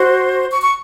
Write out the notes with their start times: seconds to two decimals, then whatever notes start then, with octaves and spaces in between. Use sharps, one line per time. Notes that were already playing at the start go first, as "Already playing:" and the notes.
Already playing: F#4 C5
0.50 C#6
0.62 C#6